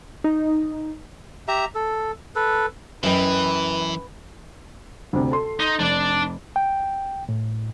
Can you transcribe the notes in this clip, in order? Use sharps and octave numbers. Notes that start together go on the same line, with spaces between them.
D#4
G4 E5 A#5
A4
A4 B4
F#2 E3 B4 D#5 G5
D2 C3
A4 C6
D#4
F1 D4 D5
G5
A2